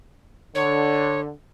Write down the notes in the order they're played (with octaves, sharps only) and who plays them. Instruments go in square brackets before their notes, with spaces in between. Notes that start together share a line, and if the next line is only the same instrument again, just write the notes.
[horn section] D3 [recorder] C#5